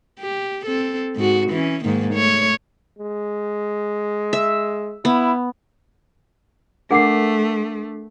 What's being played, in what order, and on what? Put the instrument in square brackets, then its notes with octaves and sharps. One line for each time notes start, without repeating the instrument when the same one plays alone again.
[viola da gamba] G4
C4 A4
G#2 F#4
E3 C#4
G#2 D#3 A#3
A3 C#5
[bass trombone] G#3
[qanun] E5
[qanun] B3 [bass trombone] E4
[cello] A3 [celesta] D4 D6 C7 [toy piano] G#4 A#4 F#5